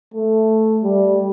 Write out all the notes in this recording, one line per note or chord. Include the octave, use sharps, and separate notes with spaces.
A3
G3